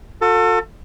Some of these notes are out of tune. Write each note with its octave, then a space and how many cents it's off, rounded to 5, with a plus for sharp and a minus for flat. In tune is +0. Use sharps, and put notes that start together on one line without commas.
F#4 -45 A4 +25